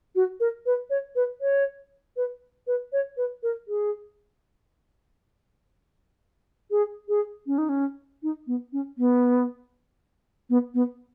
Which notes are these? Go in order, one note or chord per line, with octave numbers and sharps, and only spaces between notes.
F#4
A#4
B4
C#5
B4
C#5
B4
B4
C#5
B4
A#4
G#4
G#4
G#4
C#4
D#4
C#4
D#4
B3
C#4
B3
B3
B3